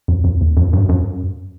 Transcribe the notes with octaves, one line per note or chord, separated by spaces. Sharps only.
F#2
F#2
E2
F#2
G2
F#2